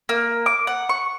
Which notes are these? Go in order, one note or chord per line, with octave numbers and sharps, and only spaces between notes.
A#3
D6
F#5
C#6